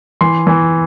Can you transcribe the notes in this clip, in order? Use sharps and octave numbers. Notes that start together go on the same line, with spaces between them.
E3 C6
E3